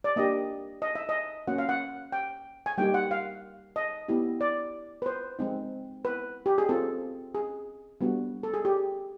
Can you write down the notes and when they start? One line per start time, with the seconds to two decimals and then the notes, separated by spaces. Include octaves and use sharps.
0.04 D5
0.16 A#3 D4 G4 D#5
0.82 D#5
0.95 E5
1.09 D#5
1.48 A#3 C#4 F#4 F#5
1.58 F5
1.69 F#5
2.12 G5
2.66 G#5
2.78 G3 A#3 D#4 G4 G5
2.94 F#5
3.11 F5
3.76 D#5
4.08 B3 E4 G4
4.41 D5
5.02 B4
5.06 C5
5.39 G#3 C4 D#4
6.05 B4
6.46 G4
6.58 G#4
6.69 C4 F4 A4
7.35 G#4
8.01 G3 B3 D4 F#4
8.43 A4
8.54 G#4
8.65 G4